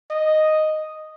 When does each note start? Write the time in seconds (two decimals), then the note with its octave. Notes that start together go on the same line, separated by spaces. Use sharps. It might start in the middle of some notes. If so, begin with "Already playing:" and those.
0.11 D#5